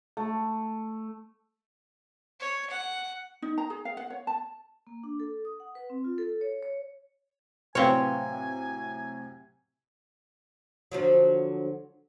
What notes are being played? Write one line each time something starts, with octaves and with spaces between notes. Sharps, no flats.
A3
C#5
F#5
D#4
A#5
G#4
F5
F#5
C#5
A5
A#3
D4
A4
D#6
F#5
B4
C4
F4
A4
C#5
C#5
A2 C3 F#3 C4 B4 C#5 F5 G#5
D3 F3 F#3